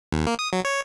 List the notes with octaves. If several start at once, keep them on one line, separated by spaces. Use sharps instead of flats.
D#2
A#3
D#6
F#3
C#5